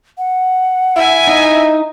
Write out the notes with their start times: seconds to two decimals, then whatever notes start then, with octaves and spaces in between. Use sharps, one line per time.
0.18 F#5
0.96 E4 E5 G#5
1.27 D#4